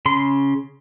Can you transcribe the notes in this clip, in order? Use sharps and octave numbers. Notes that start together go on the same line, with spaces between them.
C#3 C6